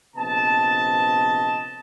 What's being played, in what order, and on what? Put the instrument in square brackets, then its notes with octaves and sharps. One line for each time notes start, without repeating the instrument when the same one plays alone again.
[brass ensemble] A#1 C3 B3 D#5 A5